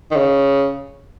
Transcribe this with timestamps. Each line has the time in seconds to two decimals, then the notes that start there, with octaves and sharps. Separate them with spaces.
0.11 D#3
0.16 C#3